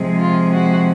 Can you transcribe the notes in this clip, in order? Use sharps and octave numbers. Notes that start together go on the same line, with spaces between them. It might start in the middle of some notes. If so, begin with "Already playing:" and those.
Already playing: C3 F3 G#3
F4
F#4